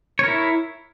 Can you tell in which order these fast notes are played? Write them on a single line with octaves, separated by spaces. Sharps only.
C#5 A#4 E4